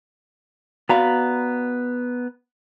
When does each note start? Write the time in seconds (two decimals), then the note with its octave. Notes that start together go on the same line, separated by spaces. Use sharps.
0.89 B3 F#4 D5 F5 A#5 B5